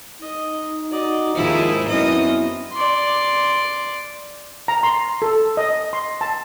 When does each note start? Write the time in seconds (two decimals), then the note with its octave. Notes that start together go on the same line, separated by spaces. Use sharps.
0.22 D#4 D#5
0.91 F#4 D5 D#5
1.35 D#2 G#2 F3 E4 A#4
1.89 F#2 B3 C4 E4 D#5
2.73 D5 C6
4.68 A#5
4.83 C6
5.22 A4
5.57 D#5
5.93 C6
6.21 A5